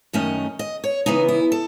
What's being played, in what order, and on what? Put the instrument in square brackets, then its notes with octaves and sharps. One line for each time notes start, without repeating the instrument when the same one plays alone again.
[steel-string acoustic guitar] F#2 D#3 A3 C#4 D#5
D#5
C#5
C#3 E3 B3 D#4
E4
A4